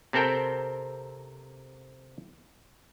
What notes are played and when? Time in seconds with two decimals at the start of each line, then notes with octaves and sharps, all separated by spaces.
0.13 C3 C4 A4 A#4 G5